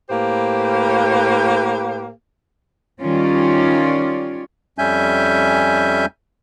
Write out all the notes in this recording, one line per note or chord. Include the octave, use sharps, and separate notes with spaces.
A2 A#3 G4 B4 C5 F5
D#3 G3 C#4 F4 C#5 D5
F2 G3 C#4 E5 G#5 G6